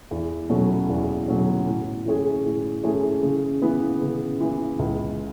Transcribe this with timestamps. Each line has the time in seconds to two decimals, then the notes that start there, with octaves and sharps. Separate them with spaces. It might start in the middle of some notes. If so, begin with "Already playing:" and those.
0.11 E2
0.50 B2 F#3 A3 C#4
0.89 E2
1.28 B2 F#3 A3 C#4
1.67 A2
2.06 E3 A3 C#4 G#4
2.45 A2
2.83 E3 A3 C#4 G#4
3.23 C#3
3.62 E3 B3
4.01 C#3
4.40 E3 B3
4.79 C#2